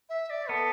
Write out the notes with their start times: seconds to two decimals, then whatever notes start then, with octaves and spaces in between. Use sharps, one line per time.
0.09 E5
0.30 D5
0.49 B3 A4